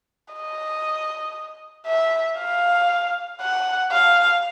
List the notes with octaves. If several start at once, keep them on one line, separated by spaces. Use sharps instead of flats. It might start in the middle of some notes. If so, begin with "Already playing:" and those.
D#5
E5
F5
F#5
F5